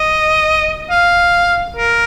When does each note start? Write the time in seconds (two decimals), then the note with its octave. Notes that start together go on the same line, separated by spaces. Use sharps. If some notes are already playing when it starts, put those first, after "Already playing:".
Already playing: D#5
0.90 F5
1.76 A#4